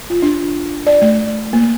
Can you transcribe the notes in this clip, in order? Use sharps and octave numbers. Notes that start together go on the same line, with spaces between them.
F4
D4
D5
A3
A#3